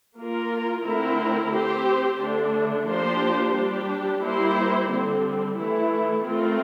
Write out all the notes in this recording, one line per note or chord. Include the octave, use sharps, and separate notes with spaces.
A#3 F4 A#4
D3 A3 C4 E4 A#4
C4 G4 C5
D3 A3 D4
F3 A#3 D4 G4 C5
G3 D4 G4
G3 A#3 E4 G4 C5
D3 G3 C4
E3 A3 E4
A3 C4 F4 A#4